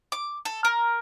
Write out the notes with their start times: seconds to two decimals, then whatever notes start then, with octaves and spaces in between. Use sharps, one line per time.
0.12 D6
0.45 A4
0.65 A#4